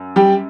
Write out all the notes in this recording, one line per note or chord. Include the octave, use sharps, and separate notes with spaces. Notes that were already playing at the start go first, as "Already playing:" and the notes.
Already playing: F#2
G3 G4